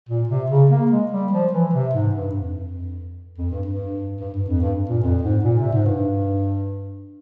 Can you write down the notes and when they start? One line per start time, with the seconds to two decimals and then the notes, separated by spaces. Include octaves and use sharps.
0.09 A#2
0.29 C3
0.50 C#3
0.70 A#3
0.91 G#3
1.11 G3
1.32 F3
1.52 E3
1.74 C3
1.93 G#2
2.14 G2
2.35 F2
3.38 F2
3.51 G2
3.66 G2
4.20 G2
4.34 G2
4.48 F2
4.62 G2
4.89 A#2
5.03 F2
5.23 G#2
5.44 A#2
5.58 C3
5.72 G#2
5.85 G2